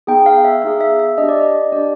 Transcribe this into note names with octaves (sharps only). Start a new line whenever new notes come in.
B3 D#4 G#4 G5
F5
E5
B3 D#4 G#4 F5
E5
E5
D4 G4 D#5
D5
D#5
D4 G4 D5